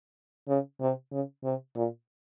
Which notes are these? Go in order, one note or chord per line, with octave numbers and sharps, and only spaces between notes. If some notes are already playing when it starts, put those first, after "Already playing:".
C#3
C3
C#3
C3
A#2